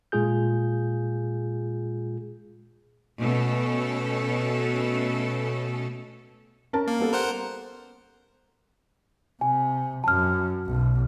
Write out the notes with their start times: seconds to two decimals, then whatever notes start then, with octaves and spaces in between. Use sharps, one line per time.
0.12 A#2 G#3 F4 G#4 G6
3.18 B2 A3 C#4 A4
6.73 C#4 A#4 A5
6.87 A#3
7.00 G3 B3 A4
7.13 A#4 C5 F#5
9.41 C3 G#5
10.04 F#2 A5 F6
10.66 B1